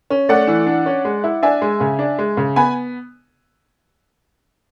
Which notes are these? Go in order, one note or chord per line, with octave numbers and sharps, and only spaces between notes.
C#4
A3 D5 F#5
E3
D4
C#4
G#3
E4
D4 E5 G#5
G#3
C#3
D4
G#3
C#3
B3 G#5 B5